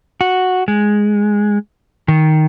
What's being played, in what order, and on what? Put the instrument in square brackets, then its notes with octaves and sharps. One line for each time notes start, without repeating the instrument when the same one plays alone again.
[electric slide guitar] F#4
G#3
D#3